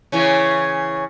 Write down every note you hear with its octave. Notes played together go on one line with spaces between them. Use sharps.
C#3 E3 C#4